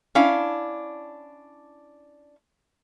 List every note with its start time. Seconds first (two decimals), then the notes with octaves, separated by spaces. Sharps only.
0.15 C#4 D4 E4 F5